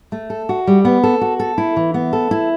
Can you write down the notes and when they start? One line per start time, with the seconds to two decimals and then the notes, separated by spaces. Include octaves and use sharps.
0.12 A3
0.30 A4
0.49 F#4
0.67 G3
0.85 B3
1.03 A4
1.21 F#4
1.40 A4
1.58 E4
1.77 E3
1.94 B3
2.13 A4
2.31 E4